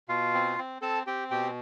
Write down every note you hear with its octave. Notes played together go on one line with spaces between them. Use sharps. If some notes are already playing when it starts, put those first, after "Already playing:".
B2 F4 F5
C4
C4
C4 A4 A5
C4 G4 G5
B2 G4 G5